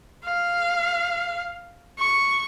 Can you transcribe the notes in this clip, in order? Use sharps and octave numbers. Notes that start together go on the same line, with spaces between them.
F5
C#6